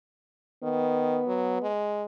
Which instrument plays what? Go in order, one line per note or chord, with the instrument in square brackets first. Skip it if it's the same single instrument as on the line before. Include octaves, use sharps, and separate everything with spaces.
[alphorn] D#3 [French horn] B3
[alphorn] F#3
G#3